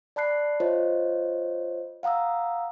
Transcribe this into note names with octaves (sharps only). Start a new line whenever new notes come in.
D5 A5 B5 F#6 C7
F4 C5 C#5 D#5
F5 F#5 A#5 D#6 E6